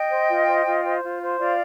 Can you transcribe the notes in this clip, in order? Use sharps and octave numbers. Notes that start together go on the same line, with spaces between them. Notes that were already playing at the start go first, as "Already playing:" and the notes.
Already playing: D#5 G5
C5
F4
C5
F4
C5
F4
C5
F4 D5 F5